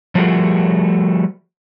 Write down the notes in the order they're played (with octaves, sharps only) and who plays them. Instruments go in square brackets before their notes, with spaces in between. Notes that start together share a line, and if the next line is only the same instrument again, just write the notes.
[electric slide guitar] F3 G3 A3 F#4 G#4 A#4